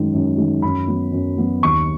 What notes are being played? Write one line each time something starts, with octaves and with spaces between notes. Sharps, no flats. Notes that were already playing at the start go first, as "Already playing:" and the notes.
Already playing: F#2 D#3 G#3
F#2
D#3 G#3
F#2 B5
F#3 B3
F#2
F#3 B3
D#2 C#6